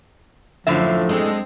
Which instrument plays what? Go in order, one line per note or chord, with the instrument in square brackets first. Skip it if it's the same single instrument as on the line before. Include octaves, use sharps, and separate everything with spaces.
[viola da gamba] F#2 D4 [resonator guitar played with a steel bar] A2 D3 E5 [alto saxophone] F3
[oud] G#3 D4 A4 [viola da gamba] C4